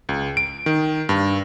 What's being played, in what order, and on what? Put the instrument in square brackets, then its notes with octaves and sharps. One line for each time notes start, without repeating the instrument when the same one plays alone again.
[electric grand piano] C#2
D7
D#3
G2